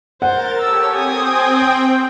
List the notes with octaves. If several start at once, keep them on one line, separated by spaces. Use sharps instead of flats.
A#4 C5 F#5 A6
G4 A4 C#5 E6
C4 G5 G#5 D#6